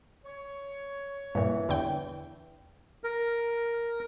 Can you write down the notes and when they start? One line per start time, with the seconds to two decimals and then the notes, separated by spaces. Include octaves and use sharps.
0.25 C#5
1.35 G2 A#2 E3
1.69 E2 D3 G5
3.04 A#4